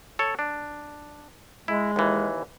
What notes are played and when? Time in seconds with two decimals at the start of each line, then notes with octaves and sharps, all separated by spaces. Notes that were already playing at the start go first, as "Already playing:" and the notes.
0.19 A4 C#5
0.39 D4
1.68 G#3 E4
1.96 D#2 E3